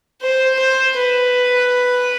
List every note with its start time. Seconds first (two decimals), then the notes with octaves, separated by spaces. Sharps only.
0.22 C5
0.59 C5
0.97 B4